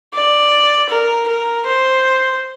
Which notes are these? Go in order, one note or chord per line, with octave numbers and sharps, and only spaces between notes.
D5
A#4
A#4
C5